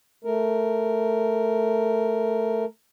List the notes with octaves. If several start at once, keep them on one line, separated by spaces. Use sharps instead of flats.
A3 A#4